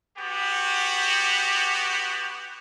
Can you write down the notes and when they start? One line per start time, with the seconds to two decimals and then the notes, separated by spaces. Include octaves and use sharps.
0.17 B3 F#4 G4